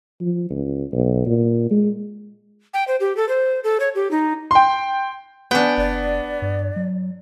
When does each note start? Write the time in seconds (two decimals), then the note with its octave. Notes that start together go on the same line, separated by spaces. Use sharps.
0.21 F3
0.51 C#2
0.93 B1
1.27 A#2
1.71 G#3
2.74 G5
2.88 C5
3.00 G4
3.17 A4
3.29 C5
3.64 A4
3.80 C#5
3.95 G4
4.11 D#4
4.51 G5 C6
5.51 B3 D4 G5 G#5
5.77 F#1 D5
6.42 G2
6.76 F#3